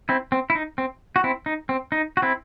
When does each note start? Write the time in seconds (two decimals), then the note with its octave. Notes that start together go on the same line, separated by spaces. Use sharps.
0.09 C4 E4
0.32 C4
0.50 E4
0.55 D#4
0.78 C4
1.16 F#4
1.24 C4 E4
1.46 D#4
1.69 C4
1.92 D#4
2.17 F#4
2.22 C4 E4